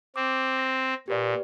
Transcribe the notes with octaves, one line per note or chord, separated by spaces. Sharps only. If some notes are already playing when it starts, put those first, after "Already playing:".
C4 D6
A#6
A#2 G4 B4 D5